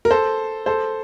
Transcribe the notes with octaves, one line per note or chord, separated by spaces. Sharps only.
A#4
A4 C5
A4 C5